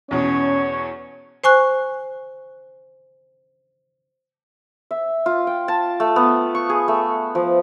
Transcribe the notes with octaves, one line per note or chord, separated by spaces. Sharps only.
E2 B2 C#4 C#5
C5 G#5 C#6 F#6
E5
F4
G5
A5
A3
B3
C#6
G#4
A3
F3